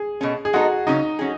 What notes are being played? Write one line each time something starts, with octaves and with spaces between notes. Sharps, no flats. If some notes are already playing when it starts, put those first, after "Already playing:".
Already playing: G#4
B2 A3 C#4
G#4
G#3 B3 D#4 F#4 A4
C#3 F#3 C#4 D#4
F#3 C#4 G#4